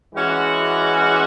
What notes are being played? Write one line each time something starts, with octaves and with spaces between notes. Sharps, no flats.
E3 G#3 C#4 F#4